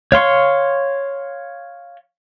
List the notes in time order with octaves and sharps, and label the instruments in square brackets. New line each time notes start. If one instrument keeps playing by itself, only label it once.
[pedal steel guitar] C#5 F5 C6 C#6